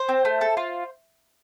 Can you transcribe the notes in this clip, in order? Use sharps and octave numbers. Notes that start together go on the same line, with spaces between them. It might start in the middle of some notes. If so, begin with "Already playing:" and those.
Already playing: C5
C4
A3
A4
F4